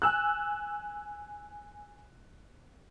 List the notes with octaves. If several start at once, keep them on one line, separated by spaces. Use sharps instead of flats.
G#5 E6 F#6